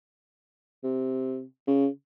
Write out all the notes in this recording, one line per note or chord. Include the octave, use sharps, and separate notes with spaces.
C3
C#3